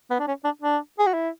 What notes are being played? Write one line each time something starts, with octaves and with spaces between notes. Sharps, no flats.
B3
D4
C#4
D4
D4
G#4
F#4
E4